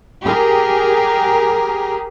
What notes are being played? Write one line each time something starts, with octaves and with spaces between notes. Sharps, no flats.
G4 G#4 A#4